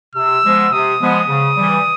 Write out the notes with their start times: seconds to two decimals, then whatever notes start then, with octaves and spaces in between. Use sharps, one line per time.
0.15 C3 E6
0.44 F3 G#3 B3
0.72 C3 D#6
1.00 F3 G#3 B3
1.28 C#3
1.56 E3 G3